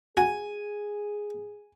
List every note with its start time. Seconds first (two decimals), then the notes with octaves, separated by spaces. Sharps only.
0.17 F#4 G#4 G#5